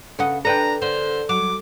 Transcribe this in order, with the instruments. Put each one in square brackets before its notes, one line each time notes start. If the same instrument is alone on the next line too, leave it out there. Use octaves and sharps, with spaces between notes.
[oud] C#3 B4 D#5 [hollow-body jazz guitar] A4 F#5
[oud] D4 G4 [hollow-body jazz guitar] A4 B4 G5 [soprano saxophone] A#5
[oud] D3 [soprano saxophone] C5
[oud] F#3 [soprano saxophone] D6